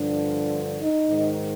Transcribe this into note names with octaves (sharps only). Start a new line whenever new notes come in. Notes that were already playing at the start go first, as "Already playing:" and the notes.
Already playing: G2 D3 F3 D4
D#4
G#2 D#3